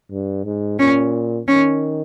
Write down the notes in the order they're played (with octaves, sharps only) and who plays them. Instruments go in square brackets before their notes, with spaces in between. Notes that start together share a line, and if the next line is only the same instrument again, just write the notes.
[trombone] G2
G#2
[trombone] A#2 [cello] C#4
[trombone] D#3 [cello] C#4